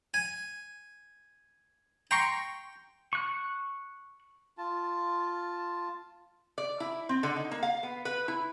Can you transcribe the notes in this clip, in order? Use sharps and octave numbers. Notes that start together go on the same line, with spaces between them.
G#5
G5 A#5 C6 C#6
C#6 F#6
F4 A5
D5
E4
C4
D3
D#4
A#3
F5
B3
B4
E4